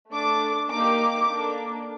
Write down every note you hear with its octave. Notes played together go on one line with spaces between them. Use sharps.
A3 D4 A4 D6
A#3 D#4 G4 D6
A#3 D4 A4